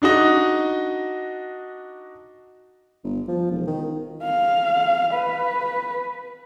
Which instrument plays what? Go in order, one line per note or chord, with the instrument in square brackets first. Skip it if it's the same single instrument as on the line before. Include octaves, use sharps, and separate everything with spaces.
[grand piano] D4 D#4 F#4 D#5
[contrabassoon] G1
F3
E1
D#3
[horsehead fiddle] F5
B4